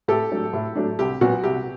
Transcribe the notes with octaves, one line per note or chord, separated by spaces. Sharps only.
A2 G4 A4
F#3 A3 D4
A2
F#3 A3 D4
C2 G4
A#2 F#3 B3 F#4
C2 G4